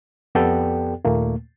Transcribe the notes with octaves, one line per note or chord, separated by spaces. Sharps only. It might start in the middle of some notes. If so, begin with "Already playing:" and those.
F2 B3 G4 A4 D5 G5
D#2 A#2 A3 A#3